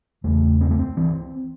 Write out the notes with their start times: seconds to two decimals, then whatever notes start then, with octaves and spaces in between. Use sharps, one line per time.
0.24 E2 C#3 A3
0.61 C4
0.71 A3
0.79 C4
0.97 E3